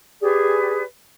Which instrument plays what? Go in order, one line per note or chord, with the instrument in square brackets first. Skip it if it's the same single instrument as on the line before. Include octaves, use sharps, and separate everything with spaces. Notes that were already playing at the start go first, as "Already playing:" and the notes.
[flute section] G4 G#4 B4 D5